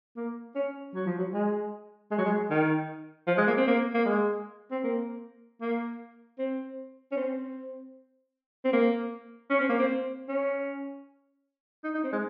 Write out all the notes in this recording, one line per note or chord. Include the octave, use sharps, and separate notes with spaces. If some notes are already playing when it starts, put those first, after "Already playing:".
A#3
C#4
F#3
F3
F#3
G#3
G#3
F#3
G#3
D#3
F3
G#3
A#3
C4
A#3
A#3
G#3
C4
A#3
A#3
C4
C#4
C4
C4
A#3
C#4
C4
A#3
C4
C#4
D#4
D#4
C4
G#3